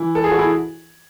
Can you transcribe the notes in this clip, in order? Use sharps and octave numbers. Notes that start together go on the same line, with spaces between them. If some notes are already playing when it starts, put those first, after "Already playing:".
Already playing: E3 E4
A4
G#4
F#4
E4